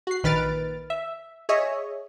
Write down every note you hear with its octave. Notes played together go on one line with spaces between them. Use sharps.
F#4 C7
A#1 D#3 B4 F6 A6 D7
E5
G#4 C#5 D#5 E5